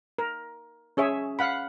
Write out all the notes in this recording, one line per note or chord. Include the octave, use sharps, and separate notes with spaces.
A#4
C#4 G#4 C#5 E5
F5 F#5 B5